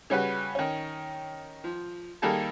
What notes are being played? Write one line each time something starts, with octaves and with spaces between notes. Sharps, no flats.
C#3 G3 C#4 F#4 B4
D#3 C#4
F3
D#3 G3 A#3 G#4 A4 A5